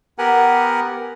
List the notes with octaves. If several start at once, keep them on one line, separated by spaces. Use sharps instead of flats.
B3 G4 A#4 F#5 G#5